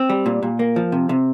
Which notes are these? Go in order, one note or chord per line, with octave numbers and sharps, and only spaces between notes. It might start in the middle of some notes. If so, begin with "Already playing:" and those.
Already playing: C4
G3
A#2
A#2
A#3
F3
C3
C3